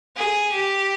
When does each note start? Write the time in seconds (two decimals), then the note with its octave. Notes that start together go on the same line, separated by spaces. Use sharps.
0.16 G#4
0.52 G4